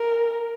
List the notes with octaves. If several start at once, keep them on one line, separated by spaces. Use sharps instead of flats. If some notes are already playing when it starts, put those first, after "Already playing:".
Already playing: A#4